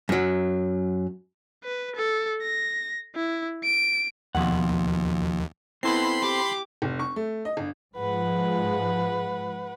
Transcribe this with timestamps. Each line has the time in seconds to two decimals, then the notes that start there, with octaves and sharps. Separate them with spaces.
0.09 F#2 F#3
1.64 B4
1.96 A4
2.42 A#6
3.15 E4
3.64 D7
4.35 D#2 B2 F3 F#5
5.83 B3 C4 E4 A4 B5 C6 C7
6.21 G4 D6
6.82 F1
6.99 C#6
7.16 A3
7.45 D#5
7.57 G1
7.96 G#2 F3 G#3 B4 F#5